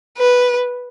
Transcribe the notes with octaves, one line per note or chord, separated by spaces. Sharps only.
B4